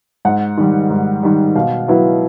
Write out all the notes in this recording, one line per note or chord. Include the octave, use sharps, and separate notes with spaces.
G#2 F#5
D#3 G3
G#2
D#3 G3
B2 F5
F#3 B3 E4